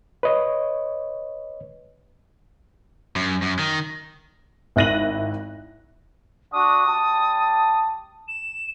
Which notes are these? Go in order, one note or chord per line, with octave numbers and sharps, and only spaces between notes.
B4 C#5 D#5
F#2
F#2
D#3
G#1 E4 F#6 A#6 D#7 F#7
D4 F#4 D#6
G3 A5
E7